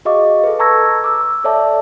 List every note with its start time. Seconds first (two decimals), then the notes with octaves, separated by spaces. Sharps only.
0.05 F#4 G#4 D#5 F5 C#6 D6
0.44 A4 B4
0.59 A5 A#5 C#6 E6 G#6 A#6
1.04 D6 E6
1.44 A4 C#5 D5 E5 A5 D6